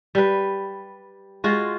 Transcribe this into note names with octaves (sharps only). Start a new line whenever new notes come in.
G3 B4
G#3 F4 F#4